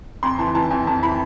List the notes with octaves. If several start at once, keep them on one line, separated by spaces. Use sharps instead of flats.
F2 C6
E3 A5
E3 A5
F2 G#5
F2 A5
E3 B5